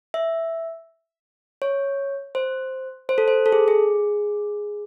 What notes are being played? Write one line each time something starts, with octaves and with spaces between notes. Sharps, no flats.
E5
C#5
C5
C5
A4
C5
A4
G#4
G#4